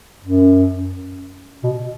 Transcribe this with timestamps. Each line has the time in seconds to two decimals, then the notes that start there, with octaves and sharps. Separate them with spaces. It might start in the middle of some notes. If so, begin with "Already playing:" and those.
0.22 F#2
1.63 B2